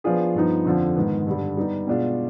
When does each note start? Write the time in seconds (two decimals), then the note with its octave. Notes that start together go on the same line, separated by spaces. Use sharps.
0.04 F3 B3 D4 F4 G#4
0.35 G2 F3 B3 D#4
0.65 F2 D3 F3
0.96 G#2 D#3 B3
1.27 G2 D3 G3
1.57 G3 B3 D#4
1.87 B2 G#3 D4 F4